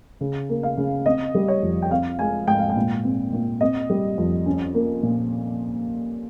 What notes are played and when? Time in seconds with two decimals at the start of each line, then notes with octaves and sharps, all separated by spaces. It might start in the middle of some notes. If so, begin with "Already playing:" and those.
0.21 C#3
0.49 A#3
0.63 F5
0.77 C#3
1.06 C4 D#5
1.35 G3
1.48 C#5
1.62 F2
1.82 G5
1.91 C4 F5
2.19 G#3 G#5
2.47 G#2 G5
2.59 F5
2.69 G5
2.76 A#2
3.04 C4
3.33 A#2
3.61 C4 D#5
3.90 G3
4.18 F2
4.46 C#4
4.75 A#3
5.03 A#2